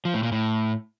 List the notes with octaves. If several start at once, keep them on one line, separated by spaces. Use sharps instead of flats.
F3
A2
A#2
A2